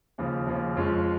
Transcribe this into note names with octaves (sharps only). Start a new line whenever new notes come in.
D#2 C#3 F3
D#2 C#3 F3
F2 F3 G#3 C#4 F4